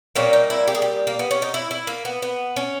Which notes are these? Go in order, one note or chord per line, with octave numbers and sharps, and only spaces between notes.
A#2 G3 A#3 C#4
D#4
E4
G4
G#4
G4
A#3
B3
C#4
D#4
E4
E4
A#3
B3
B3
C#4